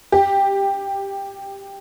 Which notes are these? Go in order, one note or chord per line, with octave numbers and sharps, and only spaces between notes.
G4